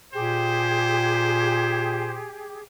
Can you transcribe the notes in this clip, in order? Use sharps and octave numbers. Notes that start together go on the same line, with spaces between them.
A#2 G4 G#4 C5